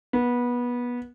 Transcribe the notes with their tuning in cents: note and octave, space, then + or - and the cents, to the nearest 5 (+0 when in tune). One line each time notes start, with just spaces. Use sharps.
B3 -20